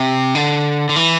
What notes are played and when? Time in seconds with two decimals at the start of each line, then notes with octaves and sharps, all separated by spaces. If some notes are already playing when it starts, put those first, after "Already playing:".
Already playing: C3
0.35 D3
0.89 D3
0.96 E3